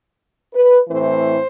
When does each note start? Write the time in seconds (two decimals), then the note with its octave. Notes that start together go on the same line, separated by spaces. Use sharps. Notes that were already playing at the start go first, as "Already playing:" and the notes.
0.53 B4
0.88 A2 E3 A3 C4 C5